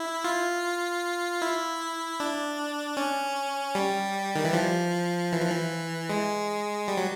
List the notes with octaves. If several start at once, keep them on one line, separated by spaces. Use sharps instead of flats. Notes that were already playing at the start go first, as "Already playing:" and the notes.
Already playing: E4
F4
E4
D4
C#4
G3
D#3
E3
F3
E3
F3
E3
G#3
G3
F#3